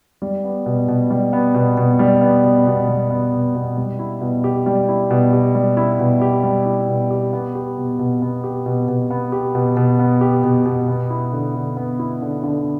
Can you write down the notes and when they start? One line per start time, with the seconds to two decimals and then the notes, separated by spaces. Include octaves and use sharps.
0.22 G3
0.44 B3
0.66 B2
0.88 B2
1.11 G3
1.33 B3
1.54 B2
1.77 B2
1.99 G3
2.21 B3
2.44 B2
2.66 B2
2.88 G3
3.10 B3
3.32 B2
3.55 B2
3.77 G3
3.99 E4
4.21 B2
4.44 G4
4.66 G3
4.89 E4
5.11 B2
5.33 G4
5.55 G3
5.77 E4
5.99 B2
6.21 G4
6.43 G3
6.66 E4
6.88 B2
7.11 G4
7.33 B3
7.55 G4
7.78 B2
7.99 B2
8.22 B3
8.44 G4
8.66 B2
8.88 B2
9.10 B3
9.32 G4
9.55 B2
9.77 B2
9.99 B3
10.21 G4
10.44 B2
10.65 B2
10.88 B3
11.10 E4
11.33 D3
11.55 D3
11.77 B3
11.99 E4
12.22 D3
12.43 D3